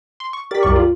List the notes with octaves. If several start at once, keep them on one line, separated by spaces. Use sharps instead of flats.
C6
C#6
G4 A#4 D5 A6 B6
C2 F#2 C#6
F4